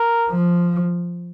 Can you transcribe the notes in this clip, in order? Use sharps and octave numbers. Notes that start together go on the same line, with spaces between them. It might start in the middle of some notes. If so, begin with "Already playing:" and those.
Already playing: A#4
F3